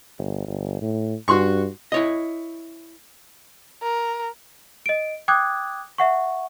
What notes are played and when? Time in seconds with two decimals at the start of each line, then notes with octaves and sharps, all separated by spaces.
0.18 G1
0.48 G1
0.81 A2
1.28 G2 F#4 C6 C#6
1.92 E4 C#5 D#5
3.82 A#4
4.86 D#5 D7
5.28 G5 D6 D#6 F#6 G#6
5.98 E5 F#5 C#6